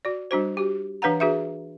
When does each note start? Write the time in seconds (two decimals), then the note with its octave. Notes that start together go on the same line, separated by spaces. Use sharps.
0.05 F#4 D5
0.31 G3 D4 F#4 C5
0.57 F#4 G4
1.02 E3 D4 B4 F5 F#5 A#5
1.20 D4 F#4 G#4 B4 E5